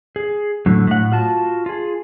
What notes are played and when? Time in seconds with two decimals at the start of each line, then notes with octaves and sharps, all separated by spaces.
0.16 G#4
0.66 A2 D3 F#3
0.87 A2 F#5
1.12 F4 F#4 A5
1.66 F4 G#4